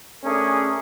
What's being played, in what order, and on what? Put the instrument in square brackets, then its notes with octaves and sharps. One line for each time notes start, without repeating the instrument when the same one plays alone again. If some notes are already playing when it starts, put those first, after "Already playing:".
[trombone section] A3 C#4 D4 G#4 A#4